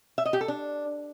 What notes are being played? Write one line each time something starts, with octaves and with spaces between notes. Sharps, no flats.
E5
D#5
G4
A4
D4